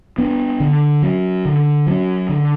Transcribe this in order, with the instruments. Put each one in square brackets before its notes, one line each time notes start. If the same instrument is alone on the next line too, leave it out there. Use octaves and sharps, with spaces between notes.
[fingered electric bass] B3 D4
D3
F#3 C#4
D3
F#3 C#4
D3